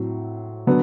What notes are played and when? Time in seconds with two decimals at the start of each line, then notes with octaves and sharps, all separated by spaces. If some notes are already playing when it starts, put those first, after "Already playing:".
Already playing: A2 F#3 C4
0.67 D3 F#3 B3